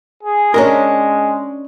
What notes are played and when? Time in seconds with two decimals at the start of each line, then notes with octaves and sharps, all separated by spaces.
0.23 G#4
0.54 G#3 C#4 D4 A#4